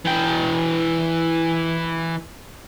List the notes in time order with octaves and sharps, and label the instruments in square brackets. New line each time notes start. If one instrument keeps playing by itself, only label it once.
[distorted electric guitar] E3 G5